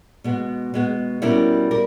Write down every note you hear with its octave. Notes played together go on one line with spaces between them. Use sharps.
B2 G#3 B3
B2 G#3 B3
B2 G3 C#4 E4 A#4
G3 A#4